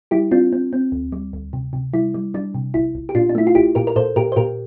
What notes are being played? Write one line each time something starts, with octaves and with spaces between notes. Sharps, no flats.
G3 E4 G4
C4 D4 F4
C4
C4
D2
G3
D2
C3
C3
G3 E4
G3
G3 D4
C3
A#1 E4
A#1
G4
A#2 D4 F4
D4
A3 E4
F4
A#1 E4 G4
A#2 G4 A#4
A#4
A#2 A4 C5
A#2 G4 A#4
C5
A#2 G4 A#4